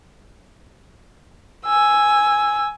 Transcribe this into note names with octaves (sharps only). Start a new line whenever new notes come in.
G#5 E6